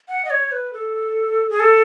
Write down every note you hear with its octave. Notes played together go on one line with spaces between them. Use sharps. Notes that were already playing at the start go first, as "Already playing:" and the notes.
F#5
D#5
C#5
B4
A4
G#4
A4